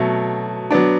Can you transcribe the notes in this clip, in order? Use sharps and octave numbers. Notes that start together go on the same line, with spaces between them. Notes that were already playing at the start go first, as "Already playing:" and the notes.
Already playing: B2 F#3 A3
F#3 B3 D4